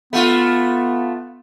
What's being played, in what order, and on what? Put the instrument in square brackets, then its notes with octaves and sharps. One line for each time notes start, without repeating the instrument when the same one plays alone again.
[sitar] A3 F4 [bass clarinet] B3